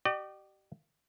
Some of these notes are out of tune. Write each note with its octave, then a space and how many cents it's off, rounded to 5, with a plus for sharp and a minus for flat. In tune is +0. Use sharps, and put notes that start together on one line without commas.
G4 -30 D5 +45